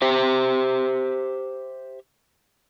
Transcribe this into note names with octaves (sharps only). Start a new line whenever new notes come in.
G4 C5 E5